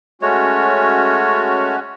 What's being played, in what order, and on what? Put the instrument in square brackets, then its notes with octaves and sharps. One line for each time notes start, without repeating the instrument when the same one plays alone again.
[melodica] G#3 A3 C#5 [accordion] C#4 F#4